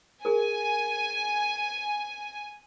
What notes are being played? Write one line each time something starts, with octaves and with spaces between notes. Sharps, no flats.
G#4 A#4 G#5